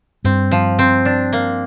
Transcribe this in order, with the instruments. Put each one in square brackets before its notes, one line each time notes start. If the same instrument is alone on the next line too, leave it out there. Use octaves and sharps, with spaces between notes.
[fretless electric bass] G2 [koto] C4
[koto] F3
C4
D4
A#3